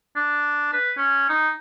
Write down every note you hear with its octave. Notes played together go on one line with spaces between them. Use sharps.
D4
B4
C#4
D#4